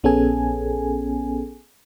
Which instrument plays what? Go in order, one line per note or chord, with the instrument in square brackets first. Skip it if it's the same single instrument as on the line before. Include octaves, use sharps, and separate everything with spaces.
[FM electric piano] A#1 B3 C#4 G#4 A4 G#5